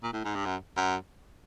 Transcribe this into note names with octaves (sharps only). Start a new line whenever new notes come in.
A#2
A2
G#2
G2
F#2
F#2